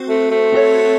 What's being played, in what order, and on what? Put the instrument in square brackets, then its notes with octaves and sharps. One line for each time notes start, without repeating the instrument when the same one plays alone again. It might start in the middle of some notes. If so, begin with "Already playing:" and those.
Already playing: [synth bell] C4 F#4 C5
[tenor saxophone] A3
A3
[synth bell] C4 F#4 A4 C#5